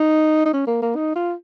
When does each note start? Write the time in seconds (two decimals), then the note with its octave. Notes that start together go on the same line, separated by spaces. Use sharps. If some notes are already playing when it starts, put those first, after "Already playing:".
Already playing: D#4
0.45 D#4
0.53 C#4
0.67 A#3
0.82 A#3
0.96 D#4
1.15 F4